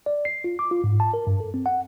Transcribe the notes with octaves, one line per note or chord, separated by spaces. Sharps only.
D5
C7
F4
D6
F4
G#2
A5
A#4
G2
A4
C4
F#5